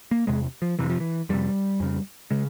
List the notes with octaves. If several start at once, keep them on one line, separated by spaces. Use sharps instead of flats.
A#3
E2 C3 G#3
F3
F2 C3 E3
F3
E3
F2 C3 G3
F2 C#3
C#3 G#3